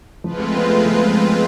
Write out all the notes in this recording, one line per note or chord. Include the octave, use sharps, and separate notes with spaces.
F3 G#3 C4 F4 B4
A3
B3
A3
F3